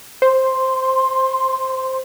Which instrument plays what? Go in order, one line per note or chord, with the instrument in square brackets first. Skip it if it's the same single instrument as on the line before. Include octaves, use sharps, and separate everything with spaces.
[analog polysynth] C5 [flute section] C6